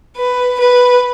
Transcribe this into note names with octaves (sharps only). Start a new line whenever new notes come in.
B4
B4